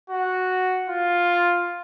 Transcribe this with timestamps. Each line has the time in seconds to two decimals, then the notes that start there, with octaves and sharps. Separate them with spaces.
0.10 F#4
0.89 F4